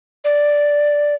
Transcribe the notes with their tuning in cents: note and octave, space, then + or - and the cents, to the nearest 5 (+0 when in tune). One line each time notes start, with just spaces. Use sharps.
D5 +0